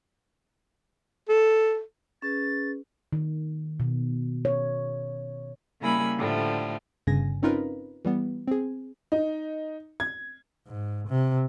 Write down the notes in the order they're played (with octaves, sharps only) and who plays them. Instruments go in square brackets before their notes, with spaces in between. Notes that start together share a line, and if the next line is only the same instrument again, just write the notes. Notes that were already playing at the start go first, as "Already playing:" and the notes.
[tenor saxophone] A4
[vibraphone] C#4 G#4 B4 [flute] A6
[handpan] D#3
B2
C#5
[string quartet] C#3 G3 A#3 E4 G#5 B5
A2 D3 F3 G3 A3
[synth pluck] G1 G2 C#3 G#5 A#6
C4 C#4 D#4 F4 A#4 B4
E3 G3 B3
C4 G#4
[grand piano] D#4
G#6
[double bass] G#2
C3